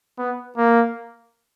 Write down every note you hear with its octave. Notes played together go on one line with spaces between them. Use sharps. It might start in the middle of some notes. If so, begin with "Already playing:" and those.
B3
A#3